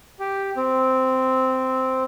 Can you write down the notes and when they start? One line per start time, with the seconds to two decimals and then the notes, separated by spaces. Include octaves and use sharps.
0.20 G4
0.57 C4